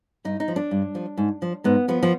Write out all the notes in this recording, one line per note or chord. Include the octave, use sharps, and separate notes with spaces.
G2 D#4
D#4
F3
D4
G2
F3
G#2
F3
G#2 B3
F3 B3
F3